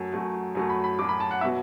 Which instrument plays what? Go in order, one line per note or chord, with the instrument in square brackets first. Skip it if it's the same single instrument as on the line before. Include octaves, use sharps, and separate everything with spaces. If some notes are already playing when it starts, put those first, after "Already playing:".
Already playing: [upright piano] F#2 F#3 A3
F#2 F#3 A3
F#2 F#3 A3
B5
B5
F#2 F#3 A3 D6
B5
A5
F#5
B2 F#3 B3 E5